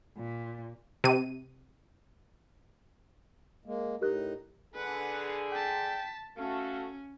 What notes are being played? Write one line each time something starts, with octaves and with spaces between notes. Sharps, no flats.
A#2
C3 D#7
G#3 A#3
A2 D#4 G4 A#4 D#5 F#6
D3 G#4 B4 F#5
G5 A5 B6
A3 C#4 F#4 A4 F5